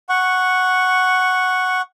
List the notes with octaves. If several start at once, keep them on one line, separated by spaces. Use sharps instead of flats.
F#5 C#6